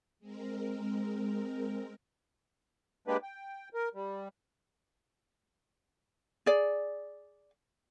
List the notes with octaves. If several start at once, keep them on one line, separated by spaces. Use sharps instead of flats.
G#3 C4 A#4
G#3 A#3 D4 G4 B4
G5
A#4
G3
G#4 D5